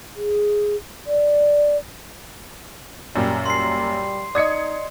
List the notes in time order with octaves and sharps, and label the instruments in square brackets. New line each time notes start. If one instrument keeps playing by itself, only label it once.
[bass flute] G#4
D5
[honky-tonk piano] F#2 A#2 [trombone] G3
[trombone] G3 [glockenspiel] C6 C7
[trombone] D#4 [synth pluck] D5 D#5 [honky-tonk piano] D#6 G#6 C#7